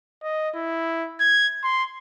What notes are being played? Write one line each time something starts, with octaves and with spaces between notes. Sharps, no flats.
D#5
E4
G#6
C6